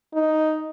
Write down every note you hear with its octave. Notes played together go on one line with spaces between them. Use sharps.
D#4